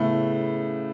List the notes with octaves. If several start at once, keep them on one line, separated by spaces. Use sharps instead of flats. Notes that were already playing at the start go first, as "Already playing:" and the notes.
Already playing: A2 C#3 A3 B3